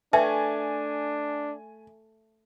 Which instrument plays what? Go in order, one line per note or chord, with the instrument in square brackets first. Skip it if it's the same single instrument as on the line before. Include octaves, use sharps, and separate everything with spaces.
[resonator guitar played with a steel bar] A3 [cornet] D4 [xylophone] B4 E5 G5 [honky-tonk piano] G#5